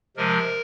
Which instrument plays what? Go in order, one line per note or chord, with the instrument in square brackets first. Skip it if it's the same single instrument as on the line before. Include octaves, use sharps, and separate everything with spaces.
[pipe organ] C3 F3 G#3 A#4